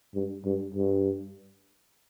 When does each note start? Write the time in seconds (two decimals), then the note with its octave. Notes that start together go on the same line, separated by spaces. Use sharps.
0.15 G2
0.45 G2
0.74 G2